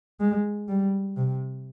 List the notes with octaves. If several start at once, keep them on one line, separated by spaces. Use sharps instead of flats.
G#3
G3
C3